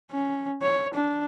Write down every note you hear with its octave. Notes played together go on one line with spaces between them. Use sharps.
C#4
C#5
D4